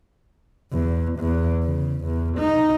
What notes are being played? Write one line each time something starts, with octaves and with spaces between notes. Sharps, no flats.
E2
E2
C#3
E2
D#4